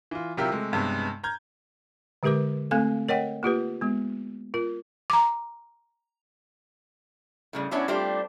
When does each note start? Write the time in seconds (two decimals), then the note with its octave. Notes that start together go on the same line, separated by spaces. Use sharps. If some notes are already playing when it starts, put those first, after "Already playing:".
0.11 E3 F4
0.37 C3 F#3 E4 F4 G4 A#4
0.51 C3 G#3 A3
0.72 B1 G2 C3 G#3 B3
1.24 A#5 F6 G6 G#6
2.23 D3 G#3 G4 A#4 B4 D6
2.71 A3 C4 A4 F5 G#5
3.09 A#4 C#5 D#5 F#5 G5
3.43 A#3 F4 G4 B4
3.81 G#3 B3
4.54 F4 A#4
5.10 A#5 D6
7.53 A2 C#3 G3
7.71 F#3 B3 C#4 D4 E4 C#5
7.88 G3 A3 C4 D4 F4 G4